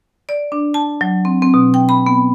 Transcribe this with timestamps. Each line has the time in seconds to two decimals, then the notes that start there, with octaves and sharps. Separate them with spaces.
0.29 D5
0.52 D4
0.74 A5
1.01 F#3
1.25 C4
1.42 C4
1.54 B2
1.74 G5
1.89 B5
2.06 B3